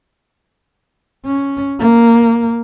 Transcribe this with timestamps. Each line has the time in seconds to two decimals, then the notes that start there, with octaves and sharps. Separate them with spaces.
1.25 C#4
1.79 A#3